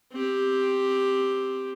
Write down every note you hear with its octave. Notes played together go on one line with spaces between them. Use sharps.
C4 G4